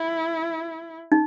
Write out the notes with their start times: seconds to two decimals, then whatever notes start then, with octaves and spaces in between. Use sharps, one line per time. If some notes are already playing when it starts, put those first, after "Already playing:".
Already playing: E4
1.12 D#4